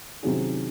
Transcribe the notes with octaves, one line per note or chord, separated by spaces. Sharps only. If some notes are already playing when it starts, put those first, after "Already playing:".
C3 D#3 F#3 C#4 G#4